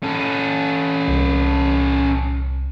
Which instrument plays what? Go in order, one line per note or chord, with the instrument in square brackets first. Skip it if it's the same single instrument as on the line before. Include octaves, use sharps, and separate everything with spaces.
[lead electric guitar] C#4 A4
[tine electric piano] C2